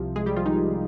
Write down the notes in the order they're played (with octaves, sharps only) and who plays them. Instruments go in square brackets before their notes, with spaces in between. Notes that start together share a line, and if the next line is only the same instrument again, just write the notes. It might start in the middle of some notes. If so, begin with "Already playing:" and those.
Already playing: [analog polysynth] C2 C3 F3
G#3 G#4
G3 G4
F3 F4
D#3 D#4